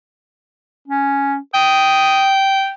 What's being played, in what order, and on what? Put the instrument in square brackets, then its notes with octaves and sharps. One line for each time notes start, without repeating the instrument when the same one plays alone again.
[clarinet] C#4
[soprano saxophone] G5 [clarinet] D#6